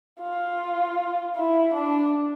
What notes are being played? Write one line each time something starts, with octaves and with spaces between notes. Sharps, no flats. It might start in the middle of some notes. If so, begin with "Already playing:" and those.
F4
E4
D4